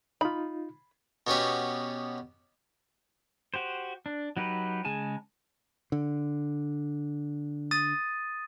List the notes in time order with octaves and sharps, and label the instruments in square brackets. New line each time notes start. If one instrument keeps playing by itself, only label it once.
[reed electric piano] D#4 F4 [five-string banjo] B5
[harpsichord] B2 B3 C#4 G4
[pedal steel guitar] F#4 G4 C5
D4
F#3 D#4 G4 B4
C#3 G#3 G#5 A5
[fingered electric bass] D3
[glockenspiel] D#6 A6 D#7